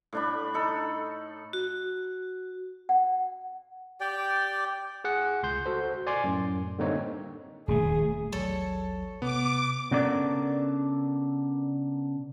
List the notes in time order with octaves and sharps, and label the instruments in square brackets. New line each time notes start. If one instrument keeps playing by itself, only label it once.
[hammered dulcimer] A2 D4 B5
D#4 A4 B5
[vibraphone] F#4
[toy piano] F#5
[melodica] G4 D5 G5
[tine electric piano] G#4 F#5
C#2 C6 G6
F#4 A4 C5
D5 G#5 C6 D6
F#2 A2
D3 G3 A#3 C4 D#4 C#5
[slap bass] D#1 A3 [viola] G#4
[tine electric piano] A1 D#2 F#3 [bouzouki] A4 C#5
[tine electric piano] C3 [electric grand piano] B3 [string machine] D6
[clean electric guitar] C#3 B3 D4 A4 A#4 D5